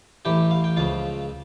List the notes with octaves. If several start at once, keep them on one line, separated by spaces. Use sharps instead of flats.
A1 A2 E3 G4 G5
F5
G5
C#2 C#3 F3 F4 F5